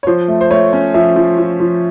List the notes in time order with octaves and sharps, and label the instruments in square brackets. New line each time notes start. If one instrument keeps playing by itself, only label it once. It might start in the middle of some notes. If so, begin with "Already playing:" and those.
[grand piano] C#5
F3 C5
A3
C5
A3 C#5
C#4
F3 E5
F3
F3
F3